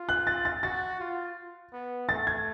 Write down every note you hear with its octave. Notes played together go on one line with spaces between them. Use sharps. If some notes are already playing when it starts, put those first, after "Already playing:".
Already playing: F4
F#6
A6
A6
F#4 A6
F4
B3
A3 A6
G#6